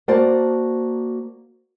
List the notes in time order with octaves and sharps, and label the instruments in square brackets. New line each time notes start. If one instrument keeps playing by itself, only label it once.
[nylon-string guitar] A#3 F#4 C5 D5 A5